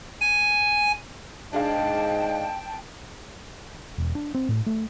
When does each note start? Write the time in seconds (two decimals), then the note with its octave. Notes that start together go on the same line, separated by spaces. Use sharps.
0.21 G#5
1.53 G#2 D4 G#4 D#5 F5 G5 A5
3.98 E1
4.15 D4
4.35 C4
4.49 A2
4.66 A3